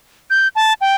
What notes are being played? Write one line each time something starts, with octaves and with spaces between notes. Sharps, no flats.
G6
A5
G5